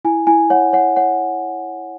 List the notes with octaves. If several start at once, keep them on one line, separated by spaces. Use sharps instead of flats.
E4 G#5
E4 G#5
C#5 F#5
C#5 F#5
C#5 F#5